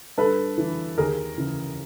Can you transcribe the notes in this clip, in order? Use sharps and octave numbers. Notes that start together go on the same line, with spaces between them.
G2 A4 B4
E3
D#2 G#4 A#4
C#3 E3